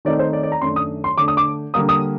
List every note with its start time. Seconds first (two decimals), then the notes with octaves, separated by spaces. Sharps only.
0.05 D#3 A3 C4 D#4 D5
0.19 C5
0.33 D5
0.43 D5
0.52 A#5
0.61 F#2 D#3 A3 D4 C6
0.76 D#6
1.04 C6
1.17 D3 A3 D4 D6
1.28 D#6
1.37 D6
1.74 D3 G3 A#3 D#6
1.89 D#6